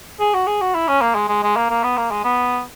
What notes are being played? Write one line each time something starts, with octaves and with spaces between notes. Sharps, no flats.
G#4
F#4
G#4
F#4
E4
C#4
A#3
G#3
G#3
G#3
A#3
A#3
B3
A#3
G#3
B3